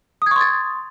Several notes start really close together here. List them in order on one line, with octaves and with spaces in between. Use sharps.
D#6 G#6 C#6 C6 A6